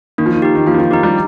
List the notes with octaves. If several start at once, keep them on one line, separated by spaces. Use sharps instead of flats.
D#3 A#3
F3
D#3
D#4 G4
D#3
F3 A#3
D#3
F3
D#3 D#4 G4
G3